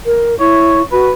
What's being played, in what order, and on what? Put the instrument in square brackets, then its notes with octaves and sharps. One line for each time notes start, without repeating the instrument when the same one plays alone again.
[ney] A#4
[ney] E4 [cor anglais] C#5
[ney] F#4 [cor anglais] B4